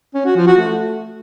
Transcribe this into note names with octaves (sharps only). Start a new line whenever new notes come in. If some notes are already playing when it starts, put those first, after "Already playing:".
C#4
F#4
F3
F#4
A3